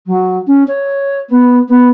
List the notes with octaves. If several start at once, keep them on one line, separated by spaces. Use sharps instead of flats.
F#3
C#4
C#5
B3
B3